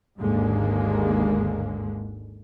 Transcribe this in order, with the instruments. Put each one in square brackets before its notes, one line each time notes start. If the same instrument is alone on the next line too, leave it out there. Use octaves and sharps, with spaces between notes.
[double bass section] G#1 D#2 G#2 D3 G#3 A#3